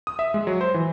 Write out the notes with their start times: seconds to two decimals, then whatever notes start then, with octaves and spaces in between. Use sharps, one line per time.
0.07 D#6
0.19 E5
0.34 G#3
0.47 F#3
0.61 C5
0.74 E3